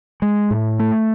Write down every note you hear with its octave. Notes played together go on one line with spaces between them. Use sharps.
G#3
A2
A3